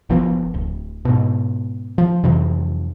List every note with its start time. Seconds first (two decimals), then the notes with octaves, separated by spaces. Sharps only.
0.10 F#1 F3 B3
0.54 D1
1.05 G#2 B2
1.98 F3
2.23 F2 C3 E3 F#3